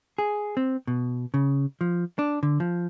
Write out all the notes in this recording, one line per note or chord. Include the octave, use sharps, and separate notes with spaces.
G#4
C4
B2
C#3
F3
D4
D3
F3